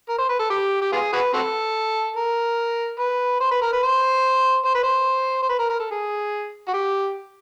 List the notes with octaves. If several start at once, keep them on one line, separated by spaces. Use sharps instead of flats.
A#4
C5
B4
A4
G4
G4
B3 F4 G#4
F#4 G#4 B4
C4 F#4 A4
A#4
B4
C5
B4
A#4
B4
C5
C5
B4
C5
C5
B4
A#4
A#4
A4
G#4
F#4
G4